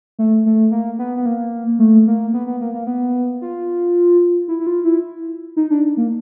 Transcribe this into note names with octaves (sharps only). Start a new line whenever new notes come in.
A3
A3
A#3
B3
B3
A#3
A3
A#3
B3
B3
A#3
A#3
B3
F4
E4
E4
F4
E4
D#4
D4
A#3